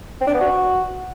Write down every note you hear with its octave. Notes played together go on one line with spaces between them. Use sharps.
C4
D4
B3
F#4